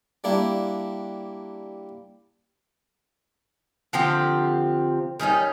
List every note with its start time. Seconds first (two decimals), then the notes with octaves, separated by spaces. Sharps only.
0.24 G3 A#3 D4 E4
3.93 D3 F3 C4 G4
5.20 D#3 G3 C#4 D#4